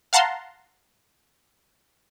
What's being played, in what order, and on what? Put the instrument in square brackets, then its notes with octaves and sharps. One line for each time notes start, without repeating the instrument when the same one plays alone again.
[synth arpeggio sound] F5 F#5 A5 A#5 C6